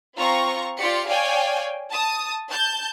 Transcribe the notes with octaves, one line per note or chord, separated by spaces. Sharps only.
C4 F4 A#5 C#6
F4 G4 D5 C#7
C#5 D5 F5 G5 G#5
A5 D#6
A5 G6